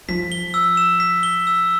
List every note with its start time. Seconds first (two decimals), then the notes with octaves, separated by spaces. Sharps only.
0.09 F3 B6
0.32 G7
0.54 E6
0.77 E7
1.00 B6
1.23 G7
1.47 E6